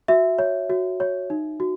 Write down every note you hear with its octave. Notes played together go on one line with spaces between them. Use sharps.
F#4 E5
C#5
F#4
C#5
D#4
F#4